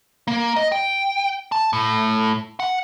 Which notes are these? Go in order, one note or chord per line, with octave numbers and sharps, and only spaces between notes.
A#3
D#5
G5
A5
A2
F#5